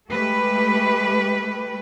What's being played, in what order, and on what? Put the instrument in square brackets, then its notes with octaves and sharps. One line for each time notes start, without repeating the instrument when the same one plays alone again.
[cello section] G#3 A3 G4 B4